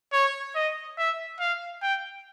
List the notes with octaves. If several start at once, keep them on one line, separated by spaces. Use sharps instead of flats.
C#5
D#5
E5
F5
G5